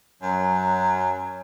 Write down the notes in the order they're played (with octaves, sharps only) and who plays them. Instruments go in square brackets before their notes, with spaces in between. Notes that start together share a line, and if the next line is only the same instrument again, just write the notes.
[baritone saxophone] F#2 [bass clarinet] F#3